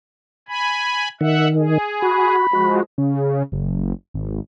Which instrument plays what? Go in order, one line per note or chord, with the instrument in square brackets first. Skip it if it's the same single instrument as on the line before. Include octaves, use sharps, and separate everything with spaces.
[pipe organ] G#5 B5
[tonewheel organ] D#3 [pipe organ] E5 F#5
[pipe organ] G#4
[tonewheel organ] F#4 [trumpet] B5
[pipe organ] F3 G#3 [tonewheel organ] F#4
[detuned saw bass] C#3
F#1
G#1